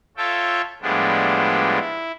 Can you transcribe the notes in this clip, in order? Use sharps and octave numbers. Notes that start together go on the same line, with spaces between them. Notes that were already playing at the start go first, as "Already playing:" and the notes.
F4 A4 C#5 E5 G5 A5
A2 F3 G3 G#3 B3 D4
E4